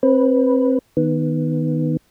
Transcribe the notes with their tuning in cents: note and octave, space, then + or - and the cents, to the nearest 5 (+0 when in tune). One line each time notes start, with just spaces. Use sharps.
C4 +25 B4 -5
D#3 +0 B3 +0